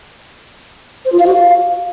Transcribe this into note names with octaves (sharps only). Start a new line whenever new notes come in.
C5
F4
F5
F#4
F5